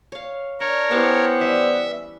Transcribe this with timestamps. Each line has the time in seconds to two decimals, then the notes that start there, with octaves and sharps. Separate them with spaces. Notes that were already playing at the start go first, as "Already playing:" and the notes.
0.12 C#5 F5
0.60 D4 A#4 C#5
0.91 B3 C#4 E4 G4 C5 E5 A5
1.40 E3 G3 E5